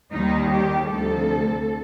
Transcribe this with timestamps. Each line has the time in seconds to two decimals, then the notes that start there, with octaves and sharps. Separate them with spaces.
0.12 D#2 D#3 G3 D#4
0.51 G4
0.90 D2 C3 F3 A4